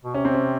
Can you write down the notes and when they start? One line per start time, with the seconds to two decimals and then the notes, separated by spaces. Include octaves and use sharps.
0.05 B2
0.14 C3 C#4
0.25 C4
0.35 C#4